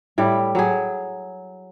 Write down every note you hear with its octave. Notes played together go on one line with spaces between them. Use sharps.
A2 G3 E4
F#3 G#4